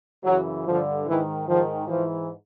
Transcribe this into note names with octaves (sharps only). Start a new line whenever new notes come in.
F#2 C#3 E3 F#3
G2 D3 F3
G#2 D#3 E3
G#2 D#3 F3
G#2 E3 F3